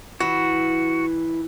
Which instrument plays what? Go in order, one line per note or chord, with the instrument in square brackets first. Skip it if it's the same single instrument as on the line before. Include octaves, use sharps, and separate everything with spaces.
[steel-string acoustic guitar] E3 [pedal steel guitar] F#4